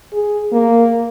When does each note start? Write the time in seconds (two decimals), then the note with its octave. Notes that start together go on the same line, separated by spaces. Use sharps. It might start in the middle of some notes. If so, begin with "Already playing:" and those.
0.13 G#4
0.53 A#3